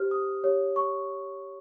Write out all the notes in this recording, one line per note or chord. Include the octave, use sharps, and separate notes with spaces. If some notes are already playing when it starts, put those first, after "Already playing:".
Already playing: G4 C5 F6
D#6
G4 C#5
C#6